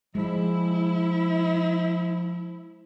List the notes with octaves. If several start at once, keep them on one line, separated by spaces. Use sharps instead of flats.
F3 G#3 E4